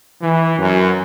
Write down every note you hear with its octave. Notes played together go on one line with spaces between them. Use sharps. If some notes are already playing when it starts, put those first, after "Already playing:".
E3
F#2